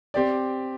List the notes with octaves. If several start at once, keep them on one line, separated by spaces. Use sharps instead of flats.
C4 G4 D5